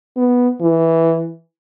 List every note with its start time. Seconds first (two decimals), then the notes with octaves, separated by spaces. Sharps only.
0.17 B3
0.62 E3